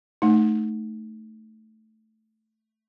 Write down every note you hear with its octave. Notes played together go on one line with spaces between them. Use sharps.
A3 D#4